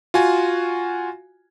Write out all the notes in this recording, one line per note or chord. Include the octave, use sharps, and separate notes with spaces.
F4 F#4 G#5